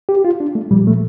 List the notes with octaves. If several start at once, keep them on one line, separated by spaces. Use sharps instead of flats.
G4
F4
D4
A3
A#2 F3 G3
A3